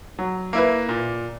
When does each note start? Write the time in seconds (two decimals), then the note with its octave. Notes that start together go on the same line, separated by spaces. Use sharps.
0.19 F#3
0.53 A#3 E4 B4
0.89 A#2